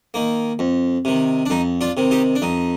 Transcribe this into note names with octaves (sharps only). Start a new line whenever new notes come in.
D#3 A#3
F2
C3 D#3
D4
F2 D#4
D4 F4
C3 D#3
D#4 G4
D4
F2 D#4